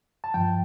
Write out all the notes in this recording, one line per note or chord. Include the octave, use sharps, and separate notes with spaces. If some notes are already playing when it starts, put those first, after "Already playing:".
A5
G2 F3 G5